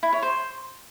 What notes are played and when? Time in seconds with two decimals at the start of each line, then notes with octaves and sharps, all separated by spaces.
0.03 E4
0.13 C#5
0.23 C5